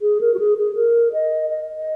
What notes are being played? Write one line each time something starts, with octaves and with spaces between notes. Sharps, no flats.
G#4
A#4
F#4
G#4
G#4
A#4
D#5
D#5
D#5